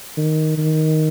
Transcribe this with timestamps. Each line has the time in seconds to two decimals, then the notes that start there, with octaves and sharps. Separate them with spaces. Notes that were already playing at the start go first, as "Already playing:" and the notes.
0.17 D#3
0.58 D#3